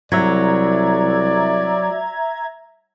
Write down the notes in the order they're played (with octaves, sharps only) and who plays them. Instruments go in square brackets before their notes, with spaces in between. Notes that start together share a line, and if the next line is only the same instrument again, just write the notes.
[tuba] C2 [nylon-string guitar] F#3 [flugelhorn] D5 [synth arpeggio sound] E5 A#5 G#6